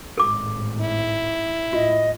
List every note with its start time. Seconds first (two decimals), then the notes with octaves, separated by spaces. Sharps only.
0.18 G#1 A2 A4 D6
0.81 E4
1.73 A2 F4 D#5